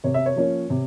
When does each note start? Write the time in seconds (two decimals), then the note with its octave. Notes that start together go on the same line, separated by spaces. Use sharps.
0.04 C3 C#5
0.14 E5
0.26 C#5
0.36 F3 A#3 C#4
0.70 C3